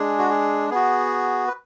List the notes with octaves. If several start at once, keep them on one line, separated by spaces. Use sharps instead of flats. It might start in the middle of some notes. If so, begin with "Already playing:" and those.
Already playing: G#3 D4 G#4
F#4
G#4
B3 F#4 G#4
B4